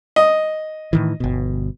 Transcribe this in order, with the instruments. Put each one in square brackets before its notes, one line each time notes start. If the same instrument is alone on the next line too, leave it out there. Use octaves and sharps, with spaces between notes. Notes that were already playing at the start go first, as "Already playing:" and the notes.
[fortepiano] D#5
[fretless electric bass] A2 D#3 E3
G1 B2